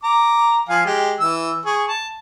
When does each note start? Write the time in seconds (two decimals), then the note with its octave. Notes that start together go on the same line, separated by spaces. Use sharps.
0.04 A#5 D6
0.69 F3 F5 G#5
0.86 G#3 G4
1.20 E3 E6
1.66 G#4 C#6
1.88 A5